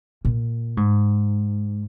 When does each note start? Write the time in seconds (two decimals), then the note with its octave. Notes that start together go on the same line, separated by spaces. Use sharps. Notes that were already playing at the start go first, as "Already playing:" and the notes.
0.25 A#2
0.77 G#2